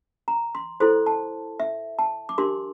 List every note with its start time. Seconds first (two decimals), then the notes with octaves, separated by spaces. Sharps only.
0.28 A#5
0.55 C6
0.80 E4 A4 C5 C6
1.06 A5
1.60 E5
1.99 A5
2.29 D6
2.38 D4 G4 A#4 C6